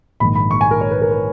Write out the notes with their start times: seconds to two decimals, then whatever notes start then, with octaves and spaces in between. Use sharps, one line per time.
0.20 A#1 G#2 D#3 B5
0.35 B5
0.51 C#6
0.61 G#5
0.71 A#4
0.81 C#5
0.91 B4
1.02 A#4
1.11 B4